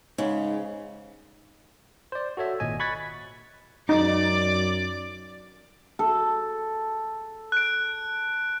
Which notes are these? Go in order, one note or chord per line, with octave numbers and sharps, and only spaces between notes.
G#2 C#3
C5 D5
F#4 A4 C#5 E5
G#1 A#2 D#5 G#5
B5 C#6 F#6 G#6 A6 B6
F#2 D#4 D5 D6
A4
F#6 D7